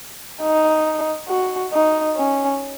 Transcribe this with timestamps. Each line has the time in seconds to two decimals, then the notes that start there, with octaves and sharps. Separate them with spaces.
0.42 D#4
1.29 F#4
1.73 D#4
2.17 C#4